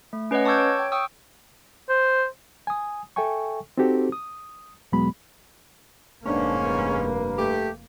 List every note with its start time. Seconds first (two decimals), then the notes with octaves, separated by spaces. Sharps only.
0.13 A3
0.31 C#4 B4 C#5 D#5 F#5
0.45 A5 C#6 D6 E6 G6 G#6
0.58 C#5
0.79 G5
0.92 G5 C#6 D#6 E6
1.89 C5
2.67 G#5 D#6
3.16 A4 E5 G5 G#5 C#6
3.78 C4 D#4 F#4 G4 A4 C5
4.12 D#6
4.92 E2 B2 F#3 G#3 B3 B5
6.25 F1 G#2 A#3 B3 C#4 D4
6.63 G2 A#4 B4
7.37 A3 G4